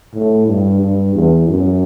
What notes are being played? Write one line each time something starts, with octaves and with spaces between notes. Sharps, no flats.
A2
G2
G2
E2
F#2